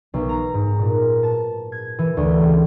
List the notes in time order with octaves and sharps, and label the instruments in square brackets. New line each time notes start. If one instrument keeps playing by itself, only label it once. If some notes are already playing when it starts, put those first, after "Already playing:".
[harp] B1
A#5
G#2
A#2
A5
G#6
E3
D2
C#2